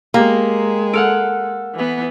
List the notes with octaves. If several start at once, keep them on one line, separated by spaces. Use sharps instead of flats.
G#3 A#3 G4 A#5
A4 F#5 F6 D7
E3 B3